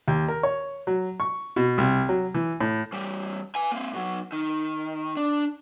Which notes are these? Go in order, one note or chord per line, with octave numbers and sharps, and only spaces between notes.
D#2
A#4
C#5
F#3
C#6
B2
C2
F#3
E3
A2
E3 G3
B4 G#5
A#3 C4
B2 F#3
D#3
D4